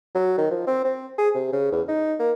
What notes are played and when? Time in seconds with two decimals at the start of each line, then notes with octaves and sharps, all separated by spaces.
0.15 F#3
0.38 D#3
0.51 F3
0.67 C4
0.85 C4
1.19 G#4
1.35 C3
1.53 C#3
1.72 E2
1.89 D#4
2.20 A#3